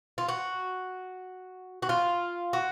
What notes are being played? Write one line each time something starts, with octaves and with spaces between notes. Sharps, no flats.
F4
F#4
F#4
F4
F#4